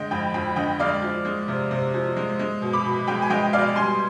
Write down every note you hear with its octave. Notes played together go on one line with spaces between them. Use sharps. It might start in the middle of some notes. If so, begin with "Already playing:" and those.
Already playing: D3 G#3 D#5 G5
F2 G5 B5
F2 G5 B5
D3 D#5 G5
G#3 D5 F5
F3
G#3
C3
C3
F3
G#3
G#3
B2
B5 D6
B2
G#3 G5 B5
G#5
G#3 D#5 G5
B2 D5 F5
G3 G#5 C6